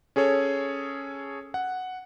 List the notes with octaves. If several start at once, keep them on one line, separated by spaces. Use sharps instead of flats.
C#4 G#4 A4 C#5
F#5